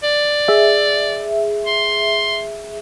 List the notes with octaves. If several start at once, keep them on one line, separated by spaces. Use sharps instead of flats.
D5
G#4 E5
C6